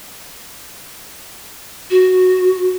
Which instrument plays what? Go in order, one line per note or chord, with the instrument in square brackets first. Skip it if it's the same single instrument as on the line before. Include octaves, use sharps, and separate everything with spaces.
[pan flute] F#4